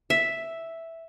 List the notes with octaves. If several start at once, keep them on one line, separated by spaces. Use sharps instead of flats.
E5